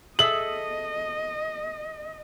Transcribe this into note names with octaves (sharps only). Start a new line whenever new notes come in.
G#4 A4 D#5 E5 F#7